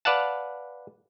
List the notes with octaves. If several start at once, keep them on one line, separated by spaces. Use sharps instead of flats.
B4 D5 F5 F#5 A5